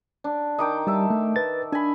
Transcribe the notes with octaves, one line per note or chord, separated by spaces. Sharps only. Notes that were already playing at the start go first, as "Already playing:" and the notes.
D4
D#3 G5 D6 D#6
G3 E5 A5
A3
B4 A6
D4 G#5 B5